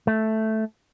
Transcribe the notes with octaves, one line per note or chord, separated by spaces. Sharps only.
A3